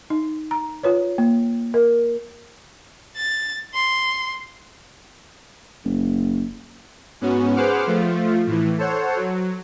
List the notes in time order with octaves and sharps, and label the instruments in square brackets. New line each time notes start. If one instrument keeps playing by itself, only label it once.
[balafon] D#4
A#5
F4 B4 C#5
A#3
A#4
[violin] A6
C6
[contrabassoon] F#1
[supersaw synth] G#2 B3 C#4 F#4
G#4 B4 C5 F#5 D6 F6
F3 A3 F4
A2 E3
A4 C5 C#5 F#5
F#3